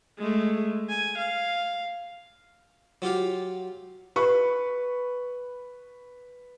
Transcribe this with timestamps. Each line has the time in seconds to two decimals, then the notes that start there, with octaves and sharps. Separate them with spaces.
0.18 G#3 A3
0.90 G#5
1.18 F5
3.02 F#3 F4 G4 F5
4.16 B4 C#6